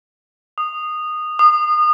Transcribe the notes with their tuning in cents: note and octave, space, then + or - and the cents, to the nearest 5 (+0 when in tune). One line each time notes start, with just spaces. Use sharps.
D#6 -15
D#6 -30